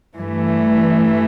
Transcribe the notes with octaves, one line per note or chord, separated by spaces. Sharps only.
G2 E3 A3